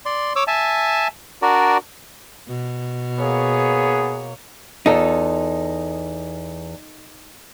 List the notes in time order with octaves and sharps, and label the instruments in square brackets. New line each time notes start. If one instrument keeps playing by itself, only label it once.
[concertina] D5 C6
C#5 D6 E6
E5 G#5 A5
D4 F#4 A#4 D5
[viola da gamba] B2
[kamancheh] A#3 C#5 [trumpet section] B3 G#4
[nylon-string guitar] E2 F4 [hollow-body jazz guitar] D#4 A4